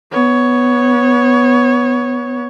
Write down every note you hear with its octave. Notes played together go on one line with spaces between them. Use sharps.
B3 C#5